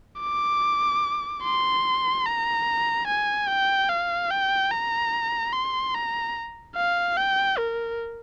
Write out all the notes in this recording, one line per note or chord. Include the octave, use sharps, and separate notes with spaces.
D6
C6
A#5
G#5
G5
F5
G5
A#5
C6
A#5
F5
G5
A#4